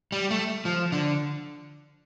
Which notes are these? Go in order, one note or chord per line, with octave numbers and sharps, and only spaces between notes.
G3
A3
F3
D3